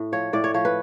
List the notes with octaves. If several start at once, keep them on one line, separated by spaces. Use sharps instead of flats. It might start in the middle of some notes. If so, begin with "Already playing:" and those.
Already playing: A2
F3 C#5
A2 D5
C#5
F3 C#5
B4